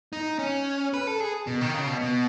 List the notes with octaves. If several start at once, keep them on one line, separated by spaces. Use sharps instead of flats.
D#4
C#4
B4
A4
G#4
B2
D#3
C#3
B2
B2